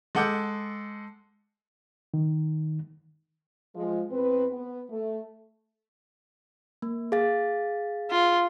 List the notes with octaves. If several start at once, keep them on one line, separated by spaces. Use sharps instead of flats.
G#3 A4 F#5 D6 G6
D#3
F3 G#3
E2 C4 B4
B3
A3
A#3
G#4 F5 A6
F4